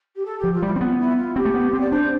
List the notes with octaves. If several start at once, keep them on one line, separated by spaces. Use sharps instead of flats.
G4
A4
F3 G4
F4
G3 E4
C4 E4
B3 F4
E4
F4
C4 G4
A3
B3
C4
D5
D4 C5